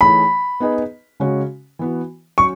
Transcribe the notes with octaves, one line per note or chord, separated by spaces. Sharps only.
E3 A3 D#4 G#4 C#5 B5
B3 D#4 G#4 B4 D#5
C#3 G#3 C#4 F#4
E3 B3 F#4
F#3 C#4 C#6